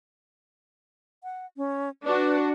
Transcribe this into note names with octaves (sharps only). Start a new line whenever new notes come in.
F#5
C#4
D4 F#4 B4